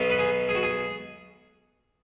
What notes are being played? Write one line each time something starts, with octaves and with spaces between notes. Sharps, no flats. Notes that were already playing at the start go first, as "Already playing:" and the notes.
Already playing: B1 B2 B3 D#4
B4
G#4
G#4
F#4
G#4